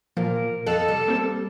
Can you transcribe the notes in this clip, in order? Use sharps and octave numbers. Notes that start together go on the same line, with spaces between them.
A#2 F3 A#4
F2 A4 D#5 F5 A5 F#6
G3
A#3 C4